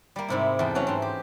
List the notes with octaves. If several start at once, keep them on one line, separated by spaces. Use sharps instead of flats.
G3 A#3
G#2 C3 E4
E2 A4 G5
E3 F#3 A3 C#4
G#2 C4
G4